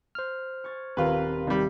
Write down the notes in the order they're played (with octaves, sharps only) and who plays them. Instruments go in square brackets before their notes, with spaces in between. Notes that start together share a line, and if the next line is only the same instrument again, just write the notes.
[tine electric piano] C5 F6
[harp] C#6 G#6 A6
[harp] D#1 [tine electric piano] C4 A#4 [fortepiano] F4 B4
[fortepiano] C3 G3 [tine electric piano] D#3